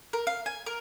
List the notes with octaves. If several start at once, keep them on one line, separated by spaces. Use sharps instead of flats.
A#4
F5
G#5
A#4